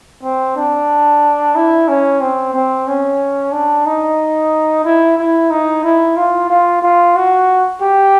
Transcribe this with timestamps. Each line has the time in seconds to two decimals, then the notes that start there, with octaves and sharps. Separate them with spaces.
0.23 C4
0.56 D4
1.55 E4
1.88 C#4
2.21 C4
2.54 C4
2.87 C#4
3.52 D4
3.86 D#4
4.84 E4
5.18 E4
5.50 D#4
5.84 E4
6.17 F4
6.50 F4
6.82 F4
7.16 F#4
7.82 G4